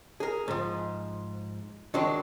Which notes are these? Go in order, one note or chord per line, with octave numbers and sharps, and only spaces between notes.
G#4 A#4
G#2 F3
D#3 F#3 G#3 D4